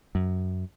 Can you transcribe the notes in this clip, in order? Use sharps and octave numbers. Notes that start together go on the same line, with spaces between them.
F#2